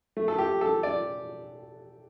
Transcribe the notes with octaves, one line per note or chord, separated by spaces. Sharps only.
A3
A4
G4
A4
D5